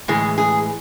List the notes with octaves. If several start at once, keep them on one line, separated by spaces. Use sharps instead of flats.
A2 E3 G#3 G#4
G#4